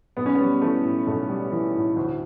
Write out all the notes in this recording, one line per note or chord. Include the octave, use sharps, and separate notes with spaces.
B1 B3
C#4
G3 B3
E3 A3
A2
B1 A3
G3
E3
A2
D2